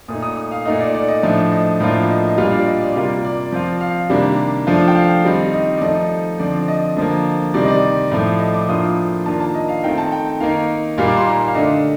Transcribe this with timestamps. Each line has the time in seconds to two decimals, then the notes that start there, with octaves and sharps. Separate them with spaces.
0.08 A#2 A3 D#4 D#6
0.23 D#6
0.37 D#6
0.51 F5
0.65 A#2 A3 D#4 D#5
0.81 D5
0.94 D5
1.08 D#5
1.23 A2 F3 A3 D4
1.52 D#5
1.80 A2 F3 A#3 D4 F4
2.09 D#5
2.28 D#5
2.38 A#2 G3 D4 F4 F5
2.52 D5
2.67 D#5
2.81 D5
2.95 C3 G3 A#3 F4
3.24 D5
3.53 F3 C4 F4
3.81 F5
4.10 C3 D#3 G3 A#3 D4
4.67 F3 A3 D4 F4
4.88 G5
4.96 F5
5.24 D#3 G3 C4 D#4
5.54 D#5
5.78 D5
5.82 F3 A3 D#4 D#5
6.39 D3 F3 C4 D5
6.68 D#5
6.97 D3 F3 A#3 D#5
7.54 C3 D#3 G3 C4 D5
7.63 D#5
7.68 D5
8.11 A2 F3 A3
8.40 D#5
8.54 D6
8.68 A2 F3 A#3 D4 F4 D#6
9.26 D#3 A#3 D4 F4 A5
9.40 A5
9.55 D#5
9.69 F5
9.83 D#3 A3 C4 D#4 G5
9.98 A5
10.12 G5
10.40 D#3 A#3 D#4 F5
10.98 A#2 G3 A#3 D#4 F5
11.08 D6
11.17 C6
11.27 A#5
11.48 F5
11.55 D3 A3 D4 D#5